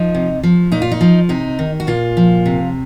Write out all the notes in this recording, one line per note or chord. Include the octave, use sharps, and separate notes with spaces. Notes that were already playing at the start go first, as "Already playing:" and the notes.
Already playing: F3 D#4
C3
F3
A#2 D#4
F4
D#4
F3
C3 D#4
D#3
F#4
A#2 F4
F3
C3